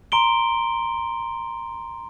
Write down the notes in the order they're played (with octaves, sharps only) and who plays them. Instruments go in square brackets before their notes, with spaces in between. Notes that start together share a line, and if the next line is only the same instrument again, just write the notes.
[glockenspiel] A#5 C6 D7 G7